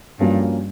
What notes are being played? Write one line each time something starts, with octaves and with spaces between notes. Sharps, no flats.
G2 F3 A#3 C#4 F#4